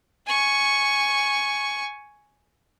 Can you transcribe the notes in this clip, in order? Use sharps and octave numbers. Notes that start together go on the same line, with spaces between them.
G#5 C#6